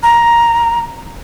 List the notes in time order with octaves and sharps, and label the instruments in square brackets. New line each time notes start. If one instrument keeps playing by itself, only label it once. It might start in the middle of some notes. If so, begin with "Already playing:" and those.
[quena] A#5